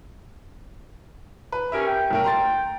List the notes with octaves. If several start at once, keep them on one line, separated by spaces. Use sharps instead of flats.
B4
C#4 G4 A#4 E5
G5
B1 A3 A#4
A#5 C6 A6